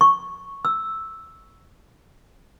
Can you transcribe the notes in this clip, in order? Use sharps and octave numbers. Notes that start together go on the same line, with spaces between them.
C#6
E6